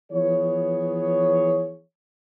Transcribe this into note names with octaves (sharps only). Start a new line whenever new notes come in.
E3 F3 B3 G#4 C#5